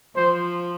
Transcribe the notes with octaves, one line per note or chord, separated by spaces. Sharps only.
F3 C5